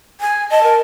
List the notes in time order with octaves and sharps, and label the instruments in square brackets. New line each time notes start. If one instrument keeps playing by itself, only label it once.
[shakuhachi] G#5
[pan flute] D#5 [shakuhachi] A5
[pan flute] A#4